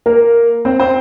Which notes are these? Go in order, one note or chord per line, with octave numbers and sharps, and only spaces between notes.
A#3 A#4
C4 C5
C4 C5